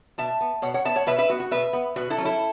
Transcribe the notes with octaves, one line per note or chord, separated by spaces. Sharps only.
B2 E5 A5
B3
B2 C#5 F#5
C#5 F#5
B3 E5 A5
C#5 F#5
B2 B4 E5
B4 E5
B3 F#4
F#4
B2 B4 E5
B3
B2 F#4 B4
E4 A4
F#3 C#4
E4 A4